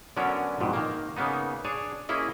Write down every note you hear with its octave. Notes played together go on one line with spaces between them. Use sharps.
D3 F#3 B3 C#4 D4 A#4
F2 G#2 B2
D#3 A#3
C#3 A#3 B3 D#4
D4 G#4 C#5
A#3 C#4 E4 G#4 D#5